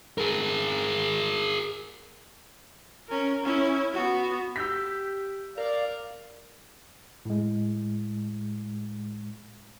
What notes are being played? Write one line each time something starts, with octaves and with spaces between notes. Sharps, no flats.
G#4 A#4
C#4 A#4
C#4 E4
B3 F#4
G4 E6 G6 B6
A#4 D5 F5
A2 G#3